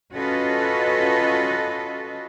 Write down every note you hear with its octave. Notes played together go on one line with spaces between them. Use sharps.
C#4 F4 F#4 A4 B4 D#5